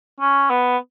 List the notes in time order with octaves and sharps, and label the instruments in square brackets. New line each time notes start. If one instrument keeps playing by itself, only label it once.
[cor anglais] C#4
B3